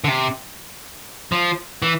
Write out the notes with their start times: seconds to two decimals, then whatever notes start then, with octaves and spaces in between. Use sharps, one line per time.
0.04 D3
0.08 C3
1.32 F3
1.82 E3